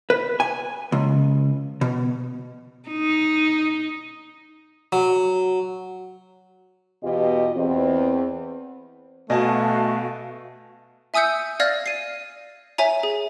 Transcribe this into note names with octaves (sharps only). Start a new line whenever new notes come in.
B4
G#5
C#2
B2
D#4
F#3
E2 B2 F4 G4 D#5
E2 C4
B2 A3 F#4 D#5 F5 G#5 A5
E5 G#5 D#6 E6 G6 C#7
D5 F5 F6 G#6 A#6
C7 D#7
C#5 E5 G#5 A#5
G#4